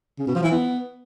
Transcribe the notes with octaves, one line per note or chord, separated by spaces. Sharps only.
C#3
B2
F3
E3
B3